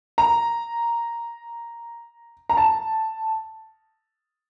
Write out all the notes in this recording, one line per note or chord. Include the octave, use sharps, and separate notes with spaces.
A#5
A#5
A5